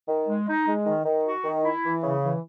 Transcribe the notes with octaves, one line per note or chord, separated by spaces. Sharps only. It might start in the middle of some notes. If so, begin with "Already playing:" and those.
D#3
G#3
D#4
G#3
D#3
D#3
F#4
D#3
E4
E3
C#3
E3